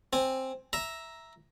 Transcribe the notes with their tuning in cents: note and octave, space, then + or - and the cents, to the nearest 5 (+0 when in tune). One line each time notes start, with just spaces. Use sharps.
C4 +5 G#5 +0
E5 +0 A#5 +5